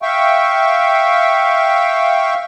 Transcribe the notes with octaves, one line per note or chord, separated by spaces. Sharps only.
E5 F5 G5 C#6